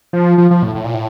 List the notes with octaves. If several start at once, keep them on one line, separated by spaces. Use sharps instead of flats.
F3
F3
F3
A2
A2
A#2
A2